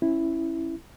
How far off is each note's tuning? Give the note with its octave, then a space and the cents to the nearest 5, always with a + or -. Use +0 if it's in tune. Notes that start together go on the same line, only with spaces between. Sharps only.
C#4 -20 E4 +0